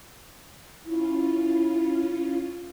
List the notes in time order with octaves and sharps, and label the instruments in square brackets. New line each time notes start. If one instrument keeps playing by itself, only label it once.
[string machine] C#4 F4 [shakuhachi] E4